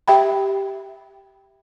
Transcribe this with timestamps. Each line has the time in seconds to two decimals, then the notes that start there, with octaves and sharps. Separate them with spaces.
0.08 G4 E5 G5 B5